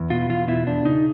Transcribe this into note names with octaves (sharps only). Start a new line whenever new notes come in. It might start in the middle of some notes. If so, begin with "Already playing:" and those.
Already playing: E2
B2 F4
E2 F4
B2 E4
E2 D4
C#3 D#4